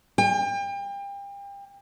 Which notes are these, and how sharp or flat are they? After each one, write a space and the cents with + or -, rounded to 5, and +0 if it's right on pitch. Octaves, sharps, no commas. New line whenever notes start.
G5 +35